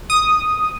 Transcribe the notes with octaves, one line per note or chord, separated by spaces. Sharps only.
D#6